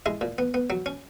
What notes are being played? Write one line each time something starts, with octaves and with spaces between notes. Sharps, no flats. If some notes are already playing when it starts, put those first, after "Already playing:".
G#3 E4
A#2
B3
B3
F#3
C#4